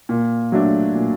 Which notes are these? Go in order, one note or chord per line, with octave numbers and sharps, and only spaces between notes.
A#2
F#3 A3 D4
A#2